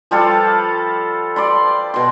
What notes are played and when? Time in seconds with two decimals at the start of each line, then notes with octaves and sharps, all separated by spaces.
0.11 F3 G3 F4 A4
1.36 D5 B5 C6
1.94 B2 C6